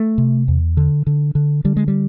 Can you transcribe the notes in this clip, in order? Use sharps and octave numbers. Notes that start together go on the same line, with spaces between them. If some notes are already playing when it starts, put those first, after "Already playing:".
Already playing: A3
C3
E2
D3
D3
D3
D3 G3
G#3
G3